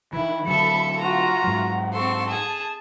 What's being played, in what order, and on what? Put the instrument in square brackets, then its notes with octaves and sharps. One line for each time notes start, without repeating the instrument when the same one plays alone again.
[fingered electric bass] D#3 E3 [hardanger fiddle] E4 [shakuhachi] B5
[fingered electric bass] D3 F#3 [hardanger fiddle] A4 E5 [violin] C#7
[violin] F4 F#4 [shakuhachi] F#5 [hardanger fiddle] A#5
[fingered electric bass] G#2 F#3
[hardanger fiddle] C4 C6 [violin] A4 C#6
[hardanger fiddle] G#4 [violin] A5